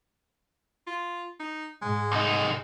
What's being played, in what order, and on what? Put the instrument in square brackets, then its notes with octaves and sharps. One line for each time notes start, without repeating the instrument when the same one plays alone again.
[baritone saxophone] F4
D#4
[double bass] G#2 [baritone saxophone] G#3
[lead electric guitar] C2 D#4